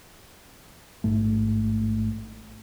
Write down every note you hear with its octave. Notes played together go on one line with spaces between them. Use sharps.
A1 G#2 A3